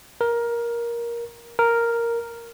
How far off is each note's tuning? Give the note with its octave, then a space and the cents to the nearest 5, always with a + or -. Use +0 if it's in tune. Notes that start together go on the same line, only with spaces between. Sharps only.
A#4 +15
A#4 +0